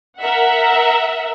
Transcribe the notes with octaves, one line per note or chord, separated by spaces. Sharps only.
A#4 E5 F#5